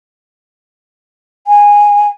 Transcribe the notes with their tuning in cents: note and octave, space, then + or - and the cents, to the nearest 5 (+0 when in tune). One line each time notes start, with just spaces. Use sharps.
G#5 -15